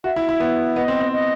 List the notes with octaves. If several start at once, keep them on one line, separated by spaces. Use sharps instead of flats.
F#4 E5
E4
E4
B3
B3 D#5
C4
C4
D#5